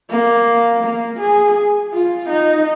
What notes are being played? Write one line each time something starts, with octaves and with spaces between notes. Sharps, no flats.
A#3
A#3
G#4
F4
D#4